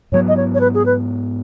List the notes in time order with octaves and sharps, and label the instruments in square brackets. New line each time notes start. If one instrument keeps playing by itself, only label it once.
[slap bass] G#2 F#3 B3 [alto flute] C#5
[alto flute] D#5
C#5
C#5
B4
G#4
B4